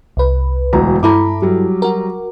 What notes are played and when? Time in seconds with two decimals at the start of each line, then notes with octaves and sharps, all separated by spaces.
0.17 C2 B4
0.73 E1 D2 A#5
1.03 G2 E4 A4 A#5 B5 D6
1.42 F#3 G3
1.82 F#4 A#4